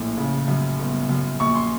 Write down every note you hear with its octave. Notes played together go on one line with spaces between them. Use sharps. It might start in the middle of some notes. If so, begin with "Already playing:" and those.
Already playing: A#1 A2
C#3
F#2
G1
F#2
A#1 C#6
C6